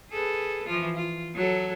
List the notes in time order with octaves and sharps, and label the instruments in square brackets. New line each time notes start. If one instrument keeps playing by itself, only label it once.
[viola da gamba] G#4 A4 B4
E3 F3 F4
F4
F#3 A4